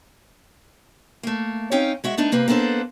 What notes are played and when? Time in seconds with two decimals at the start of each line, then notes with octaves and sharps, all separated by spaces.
1.23 A3 A#3
1.71 C4 C#4 D#4 F5 G5
2.04 G#3 F#4 E5
2.17 A3 B3 D4 D#4
2.32 C3 A#3 C4 B4
2.48 A#3 B3 D4 A4 C5